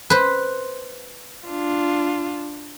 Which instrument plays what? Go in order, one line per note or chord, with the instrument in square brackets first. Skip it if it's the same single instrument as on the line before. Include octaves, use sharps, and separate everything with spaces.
[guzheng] B4 C5
[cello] D4 F4